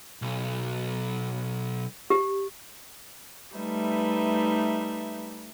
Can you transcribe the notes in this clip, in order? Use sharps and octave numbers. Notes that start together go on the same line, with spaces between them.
B1
G4
G3 A3 D#4 B4 E5